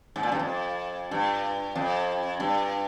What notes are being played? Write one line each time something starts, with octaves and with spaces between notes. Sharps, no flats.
G#2
A#2
G2
F2
G2
F2
G2